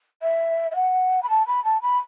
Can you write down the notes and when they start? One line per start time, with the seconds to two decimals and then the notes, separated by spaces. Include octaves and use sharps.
0.22 E5
0.71 E5
0.75 F#5
1.22 B5
1.29 A5
1.47 B5
1.64 A5
1.81 B5